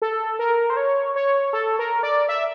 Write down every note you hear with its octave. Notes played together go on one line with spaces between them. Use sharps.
A4
A#4
C5
C#5
C#5
A4
A#4
D5
E5